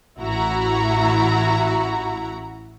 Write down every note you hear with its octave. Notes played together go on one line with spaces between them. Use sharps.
A1 E4 F#4 A#5